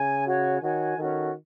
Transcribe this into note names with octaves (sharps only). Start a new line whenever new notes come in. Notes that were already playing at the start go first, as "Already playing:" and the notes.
Already playing: C#3 G#5
F#4 C#5 G#5
D#3 F#4 C#5 G#5
D#3 C#4 F#4 A4